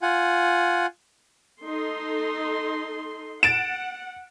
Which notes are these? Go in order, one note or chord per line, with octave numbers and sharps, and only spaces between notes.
F4 F#5 G#5
D#4 A4 C6
F#5 A6 D7 E7